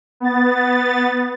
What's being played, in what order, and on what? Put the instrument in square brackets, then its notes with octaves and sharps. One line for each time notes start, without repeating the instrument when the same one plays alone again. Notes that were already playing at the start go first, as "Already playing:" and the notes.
[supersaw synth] B3 A6